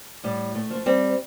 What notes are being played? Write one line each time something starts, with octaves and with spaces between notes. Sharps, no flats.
A2 G3
A3
F3 A3
G3 C4